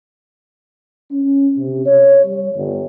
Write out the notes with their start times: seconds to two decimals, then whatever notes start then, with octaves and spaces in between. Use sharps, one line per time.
1.11 C#4
1.56 C3
1.86 C#5
2.25 G3
2.55 G1